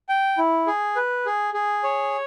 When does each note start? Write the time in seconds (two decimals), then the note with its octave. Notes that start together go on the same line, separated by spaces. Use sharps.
0.09 G5
0.38 E4
0.67 G#4
0.96 B4
1.26 G#4
1.54 G#4
1.83 C#5